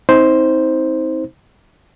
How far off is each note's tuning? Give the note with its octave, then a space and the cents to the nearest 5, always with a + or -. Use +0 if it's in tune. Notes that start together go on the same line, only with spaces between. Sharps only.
C4 +0 D#4 +40 C5 +0